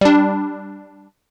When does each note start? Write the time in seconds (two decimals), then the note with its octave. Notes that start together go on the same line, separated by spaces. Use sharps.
0.01 G3 D4